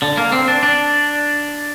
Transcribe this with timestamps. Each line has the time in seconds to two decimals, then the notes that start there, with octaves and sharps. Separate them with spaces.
0.02 D3
0.17 A#3
0.32 C4
0.48 D4
0.63 D4